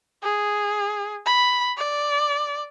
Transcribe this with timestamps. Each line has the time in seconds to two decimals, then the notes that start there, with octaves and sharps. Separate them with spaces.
0.23 G#4
1.26 B5
1.77 D5